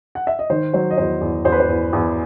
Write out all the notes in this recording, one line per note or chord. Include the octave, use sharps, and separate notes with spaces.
F#5
E5
D#5
D#3 C5
F#3 C5
D#5
E2 C5
E2
E2 C5
B4
C5
E2
E2